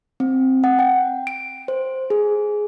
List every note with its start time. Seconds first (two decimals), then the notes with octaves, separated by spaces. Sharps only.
0.20 C4
0.64 F#5
0.79 G5
1.27 D7
1.68 C5
2.10 G#4